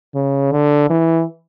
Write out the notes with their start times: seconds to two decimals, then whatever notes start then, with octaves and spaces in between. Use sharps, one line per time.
0.15 C#3
0.52 D3
0.90 E3